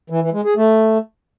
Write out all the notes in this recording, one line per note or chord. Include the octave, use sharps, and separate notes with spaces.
E3
E3
G#3
G#4
A3